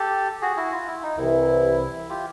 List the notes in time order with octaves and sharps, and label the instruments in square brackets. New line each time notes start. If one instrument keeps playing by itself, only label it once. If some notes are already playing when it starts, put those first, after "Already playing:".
Already playing: [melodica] G4 A4
F#4 G#4
E4 F#4
F4
E4
D#4
[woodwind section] C2 C3 E3 [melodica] E4
[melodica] F4 G4